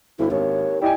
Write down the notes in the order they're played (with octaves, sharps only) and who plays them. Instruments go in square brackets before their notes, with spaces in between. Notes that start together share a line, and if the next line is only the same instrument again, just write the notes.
[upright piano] G1 [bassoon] D2 [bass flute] E4
[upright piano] G#1 [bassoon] D#2 [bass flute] C#5
[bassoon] G3 [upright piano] E4 D#5 G#5 [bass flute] G4 [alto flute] G5